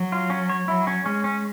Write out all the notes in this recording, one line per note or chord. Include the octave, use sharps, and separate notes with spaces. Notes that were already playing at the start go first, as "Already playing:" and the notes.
Already playing: F#3
F4
C#4
C#5
F#3 E4
C#4
G#3 C#4
C#4